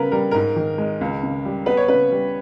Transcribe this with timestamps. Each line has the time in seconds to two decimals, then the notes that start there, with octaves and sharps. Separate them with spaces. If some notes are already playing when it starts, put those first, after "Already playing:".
Already playing: C#3 G3 B3 A#4 B4
0.12 G3 A#4
0.31 G#2 A#4
0.56 D#3
0.78 G#3
1.01 C#2
1.23 C#3
1.45 G3
1.66 B3 B4
1.77 C#5
1.88 C#3 B4
2.11 G3